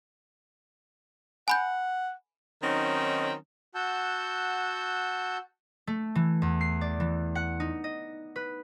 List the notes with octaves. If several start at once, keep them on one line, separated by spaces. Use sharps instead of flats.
F#5 G#5 B5 G6
D#3 F#3 C4 C#4 D#4
F#4 F#5 A5 E6 G6
A3
E3
E2
C7
D5
E3
F#5
D#4
D#5
B4